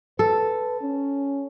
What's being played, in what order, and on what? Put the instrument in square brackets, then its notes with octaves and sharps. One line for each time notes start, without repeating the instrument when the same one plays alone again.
[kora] A4 [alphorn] B4
[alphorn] C#4